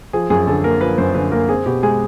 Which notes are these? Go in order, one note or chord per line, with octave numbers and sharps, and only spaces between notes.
F3 G#4
F#2 G#4
D3 A4
A#3 A#4
F3 B4
F#2 C5
D3 B4
A#3 A#4
C4 G#4
B2 G4
G#3 G#4